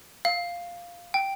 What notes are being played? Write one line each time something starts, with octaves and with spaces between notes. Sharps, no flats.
F5
G5